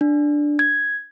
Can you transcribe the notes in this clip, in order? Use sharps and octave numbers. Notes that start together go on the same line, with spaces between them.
D4
G#6